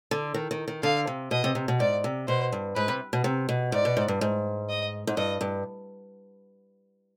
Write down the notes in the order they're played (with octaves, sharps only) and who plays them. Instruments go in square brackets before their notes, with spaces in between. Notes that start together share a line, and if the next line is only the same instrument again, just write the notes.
[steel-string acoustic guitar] D3
D#3
D#3
D#3
[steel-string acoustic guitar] D3 [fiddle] F5
[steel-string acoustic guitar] C3
[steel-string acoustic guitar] B2 [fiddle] D#5
[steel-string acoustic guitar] C3
C3
B2
[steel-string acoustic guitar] G#2 [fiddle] D5
[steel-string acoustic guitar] C3
[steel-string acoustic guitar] B2 [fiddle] C5
[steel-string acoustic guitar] G2
[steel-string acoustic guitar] G#2 [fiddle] B4
[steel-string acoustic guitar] C3
B2
C3
B2
[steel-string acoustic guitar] G#2 [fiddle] D5
[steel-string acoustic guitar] B2
G#2
G2
G#2
[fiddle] D#5
[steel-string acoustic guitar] G#2
[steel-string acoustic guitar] G2 [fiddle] D#5
[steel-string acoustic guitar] G2